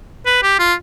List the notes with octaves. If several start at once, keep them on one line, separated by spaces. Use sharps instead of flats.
B4
G4
F4